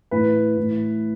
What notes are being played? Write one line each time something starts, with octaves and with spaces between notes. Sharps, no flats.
A2 E3 B4
A2 E3